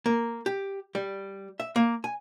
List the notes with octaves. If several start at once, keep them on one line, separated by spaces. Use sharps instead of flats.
A#3
G4
G3
E5
A#3
G#5